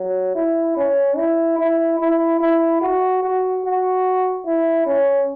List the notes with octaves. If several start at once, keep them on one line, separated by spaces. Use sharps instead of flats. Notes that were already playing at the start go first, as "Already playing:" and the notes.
Already playing: F#3
E4
C#4
E4
E4
E4
E4
F#4
F#4
F#4
E4
C#4